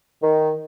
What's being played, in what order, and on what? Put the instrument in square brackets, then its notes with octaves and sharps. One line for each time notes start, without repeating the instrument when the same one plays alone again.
[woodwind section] D#3